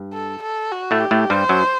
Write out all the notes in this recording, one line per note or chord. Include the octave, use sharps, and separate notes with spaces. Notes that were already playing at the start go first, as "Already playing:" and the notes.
Already playing: G2
A4
A4
F#4
A2 A3
G4
A2 A3
G2 G3 C5
F#2 F#3